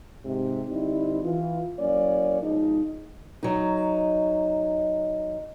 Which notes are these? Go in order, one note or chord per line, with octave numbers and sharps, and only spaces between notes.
G#2 C3
D3 G3 C4 D#4 E4
E3 F4
F#3 A#3 C#4 E4 C#5 D5
G#2 B2 F3 G#3 D#4
F#3 D#4